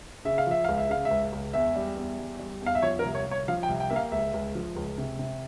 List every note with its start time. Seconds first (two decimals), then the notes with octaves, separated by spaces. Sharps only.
0.25 C#3 E5
0.38 F5
0.47 F3 E5
0.64 C#2 F5
0.78 E5
0.89 C#3 F5
1.05 E5
1.11 C#2
1.32 C#2
1.54 E2 E5
1.76 G3
1.97 E2
2.19 G3
2.39 G3
2.62 E2 F5
2.75 E5
2.82 F3 C#5
2.99 A#4
3.05 C2
3.15 C#5
3.26 C2
3.31 C#5
3.48 F3 F5
3.63 G5
3.69 C2
3.80 G5
3.90 A#3 E5
3.96 F5
4.12 C#2 E5
4.34 C#2
4.55 F3
4.76 C#2
4.98 C3
5.19 C3